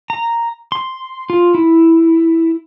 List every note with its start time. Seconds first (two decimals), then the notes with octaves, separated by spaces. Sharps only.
0.10 A#5
0.72 C6
1.30 F4
1.55 E4